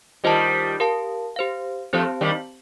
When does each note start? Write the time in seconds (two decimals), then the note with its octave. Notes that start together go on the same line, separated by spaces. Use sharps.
0.24 D#3 G3 F4 C5 D#5 A5
0.80 G4 A#4 F5 A5
1.36 G4 C5 F5
1.93 F3 A3 C4 G4 C5 F5 A5
2.21 D#3 G3